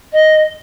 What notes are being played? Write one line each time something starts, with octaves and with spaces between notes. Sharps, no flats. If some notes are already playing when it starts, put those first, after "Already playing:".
D#5